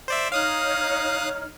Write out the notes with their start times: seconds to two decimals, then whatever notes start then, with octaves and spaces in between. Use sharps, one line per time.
0.08 C5 D5 E5
0.32 D#4 C#5 F5 D#6 F6 F#6